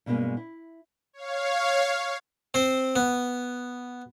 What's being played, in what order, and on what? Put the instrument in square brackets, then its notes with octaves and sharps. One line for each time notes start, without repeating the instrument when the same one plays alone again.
[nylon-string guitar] G2 B2 G#3 A#3 C#4
E4
[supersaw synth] C#5 F5
[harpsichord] C4 C5
B3